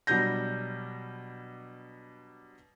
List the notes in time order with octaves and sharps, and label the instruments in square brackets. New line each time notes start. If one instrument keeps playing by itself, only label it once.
[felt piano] B2 F#3 G3 D4 G6 A#6